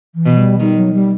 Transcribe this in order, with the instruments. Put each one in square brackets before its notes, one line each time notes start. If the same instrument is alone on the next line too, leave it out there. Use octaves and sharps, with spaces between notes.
[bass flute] E3
[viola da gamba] B2
[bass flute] G3
[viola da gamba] D#3 [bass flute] G3
[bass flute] F#3
G3